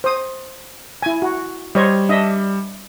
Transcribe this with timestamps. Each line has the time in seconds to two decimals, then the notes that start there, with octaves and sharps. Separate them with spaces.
0.04 C5 D#6
1.02 E4 G#5
1.22 F#4
1.75 G3 C5 C#5 D#5
2.09 D4 D#5 E5